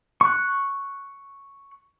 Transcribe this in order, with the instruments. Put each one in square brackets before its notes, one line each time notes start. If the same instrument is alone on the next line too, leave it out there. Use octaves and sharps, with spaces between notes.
[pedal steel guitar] C#6 F#6